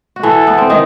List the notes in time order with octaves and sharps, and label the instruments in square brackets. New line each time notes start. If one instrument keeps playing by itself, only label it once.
[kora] F#4
[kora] E3 E4 [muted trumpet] A4
[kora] B3
C4
D#3 D#4